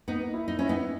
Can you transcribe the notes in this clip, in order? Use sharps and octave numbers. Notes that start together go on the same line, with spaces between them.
A#3 B3 D#4
E4
D#4
C#4 E4
B3 D#4